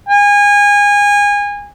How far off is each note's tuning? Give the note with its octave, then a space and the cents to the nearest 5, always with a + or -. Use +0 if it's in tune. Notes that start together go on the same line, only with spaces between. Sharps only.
G#5 -25